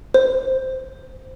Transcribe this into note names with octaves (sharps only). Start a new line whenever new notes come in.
C5